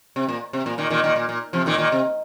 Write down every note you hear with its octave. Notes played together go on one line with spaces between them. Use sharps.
C3
A#2
C3
A#2
A#2 D#3
A#2 D#3
A#2 D#3
A#2
A#2
C3 F3
A#2 D#3
A#2 D#3
C3